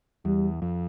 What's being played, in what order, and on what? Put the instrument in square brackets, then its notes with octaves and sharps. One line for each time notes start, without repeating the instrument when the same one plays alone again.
[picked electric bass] E2 [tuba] G3
[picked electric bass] F2